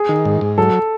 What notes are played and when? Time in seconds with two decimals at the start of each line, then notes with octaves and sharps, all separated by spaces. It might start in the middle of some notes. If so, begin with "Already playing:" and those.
Already playing: G#4
0.09 D#3
0.25 G#2
0.41 G#2
0.58 F#3 A4